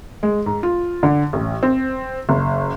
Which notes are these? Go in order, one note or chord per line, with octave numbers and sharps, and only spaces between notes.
G#3
G#2
F4
D3
A1
C4
F#1